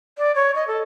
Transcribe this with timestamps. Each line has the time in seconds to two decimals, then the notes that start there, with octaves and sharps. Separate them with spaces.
0.18 D5
0.35 C#5
0.56 D#5
0.68 A4